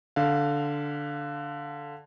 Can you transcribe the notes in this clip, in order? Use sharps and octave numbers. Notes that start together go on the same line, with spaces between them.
D3 F5